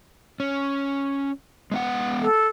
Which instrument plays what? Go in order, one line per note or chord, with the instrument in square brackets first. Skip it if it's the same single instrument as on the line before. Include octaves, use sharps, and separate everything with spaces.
[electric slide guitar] C#4
G#3 B3 F#5
[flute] A4